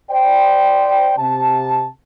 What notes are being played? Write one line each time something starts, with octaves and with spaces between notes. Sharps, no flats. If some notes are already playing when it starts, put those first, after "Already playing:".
C5 D5 G5
C3 A5